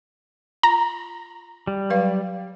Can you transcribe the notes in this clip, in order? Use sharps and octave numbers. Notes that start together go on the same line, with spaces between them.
F4 A#5
G3
F#3 B4 F5